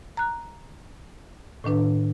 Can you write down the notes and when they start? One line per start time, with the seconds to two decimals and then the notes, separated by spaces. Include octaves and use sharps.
0.17 A#5 F#6
1.64 A2 D#3 D4 B4